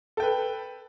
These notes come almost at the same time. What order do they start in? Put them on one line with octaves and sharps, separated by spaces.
A4 G5 B4